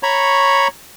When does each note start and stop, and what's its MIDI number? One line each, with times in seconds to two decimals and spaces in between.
0.03 0.68 73
0.03 0.68 82
0.03 0.68 83
0.03 0.68 85